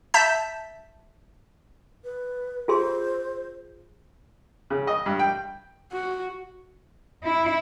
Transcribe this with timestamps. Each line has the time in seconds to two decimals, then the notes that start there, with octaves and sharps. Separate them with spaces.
0.14 E5 A5 G6 B6
2.04 B4
2.68 F4 G#4 C5 C6
4.70 C#3
4.87 D#5
5.06 G2
5.19 G5
5.92 F#4
7.24 E4